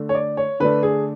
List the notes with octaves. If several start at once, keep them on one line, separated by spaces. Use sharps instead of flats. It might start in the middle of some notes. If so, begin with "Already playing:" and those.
Already playing: D3 A3 D4
C#5
D5
C#5
D3 A3 D4 B4
G#4